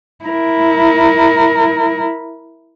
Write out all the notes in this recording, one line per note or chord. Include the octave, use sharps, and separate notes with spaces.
E4 A#4